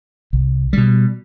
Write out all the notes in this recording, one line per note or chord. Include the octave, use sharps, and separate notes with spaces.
C2
B2 G3